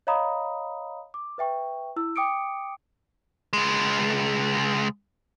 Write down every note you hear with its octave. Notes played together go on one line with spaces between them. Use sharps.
C#5 D#5 F5 A#5 B5 D#6
D6
B4 E5 G5 C#6
E4 E6
G5 D6 D#6 C#7 D7
C#2 G#3